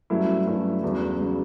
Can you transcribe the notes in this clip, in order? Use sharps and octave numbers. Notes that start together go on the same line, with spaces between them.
G2 F#3 A3 C#4 E4
G2 F#3 A3 C#4 E4
E2 C#3 F#3
C#3 F#3